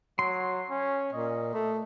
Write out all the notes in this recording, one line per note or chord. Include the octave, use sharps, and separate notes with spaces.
F#3 C6
C#4
A#2 D#5
A3